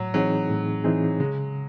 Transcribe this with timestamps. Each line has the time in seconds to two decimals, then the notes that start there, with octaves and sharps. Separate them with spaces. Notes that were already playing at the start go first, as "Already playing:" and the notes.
Already playing: A2 F#3
0.14 E3 F#3 C4 D#4 G#4
0.50 A2
0.84 E3 C4 D#4 G#4
1.19 C#3 G#3